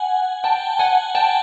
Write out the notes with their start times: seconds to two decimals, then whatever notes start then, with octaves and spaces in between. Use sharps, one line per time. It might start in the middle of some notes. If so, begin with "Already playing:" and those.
Already playing: F#5 G#5
0.44 G5 A5
0.79 F#5 G#5
1.15 G5 A5